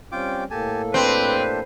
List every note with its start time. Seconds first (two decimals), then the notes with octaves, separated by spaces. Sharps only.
0.12 G3 C4 C#4 F4 G5 D6
0.51 A2 A#3 G4 A4 G#5 A5
0.94 C4 D4 G4 B4 C5